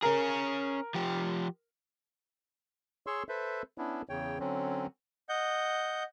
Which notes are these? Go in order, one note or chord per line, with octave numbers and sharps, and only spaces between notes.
C#4 G#4 A#4
F3 G4
G#4 C#5 C6 C#6 E6
A4 B4 C5 E5
B3 C#4 D4 E4
E2 C#3 C#5 G5
D3 F#3 C4 C#4
D#5 F#5 G6